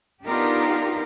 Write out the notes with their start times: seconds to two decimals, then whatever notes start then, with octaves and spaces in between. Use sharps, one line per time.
0.24 B3 D4 D#4 F4 G4 A#4